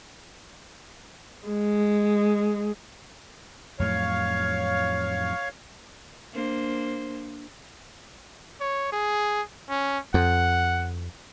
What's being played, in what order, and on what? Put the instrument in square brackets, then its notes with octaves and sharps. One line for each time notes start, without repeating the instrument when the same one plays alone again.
[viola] G#3
[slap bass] F2 A2 F#3 [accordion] C#5 F5
[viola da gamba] A#3 D4 C5
[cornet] C#5
G#4
C#4
[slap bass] F2 [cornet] F#5